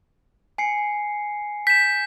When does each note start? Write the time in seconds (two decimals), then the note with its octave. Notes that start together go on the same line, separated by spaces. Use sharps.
0.58 G#5 C7 C#7
1.67 G6 B6 E7